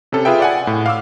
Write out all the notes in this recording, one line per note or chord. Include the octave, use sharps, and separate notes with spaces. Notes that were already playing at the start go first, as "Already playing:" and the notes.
C3 C#4 A4
F4 G#4 B4 E5 G5
D5 F#5 G#5
A2
F5 D6 E6